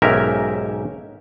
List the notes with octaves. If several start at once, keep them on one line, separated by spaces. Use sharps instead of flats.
B1 G#2 C#4 G4 A#4 E5